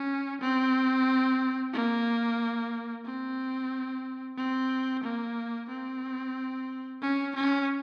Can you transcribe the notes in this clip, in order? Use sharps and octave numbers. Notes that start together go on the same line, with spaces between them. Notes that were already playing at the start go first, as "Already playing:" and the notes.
Already playing: C#4
C4
A#3
C4
C4
A#3
C4
C#4
C#4